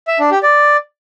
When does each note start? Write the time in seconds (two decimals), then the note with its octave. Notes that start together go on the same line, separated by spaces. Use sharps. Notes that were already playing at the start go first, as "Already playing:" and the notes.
0.08 E5
0.19 D4
0.31 G4
0.43 D5